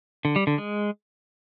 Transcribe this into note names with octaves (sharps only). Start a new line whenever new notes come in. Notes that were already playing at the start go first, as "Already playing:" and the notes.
D3
G3
D3
G#3